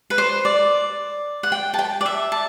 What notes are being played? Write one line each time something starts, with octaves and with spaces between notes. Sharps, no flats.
B4
C5
D5
F#5
G5
A5
G5
D5
E5
A5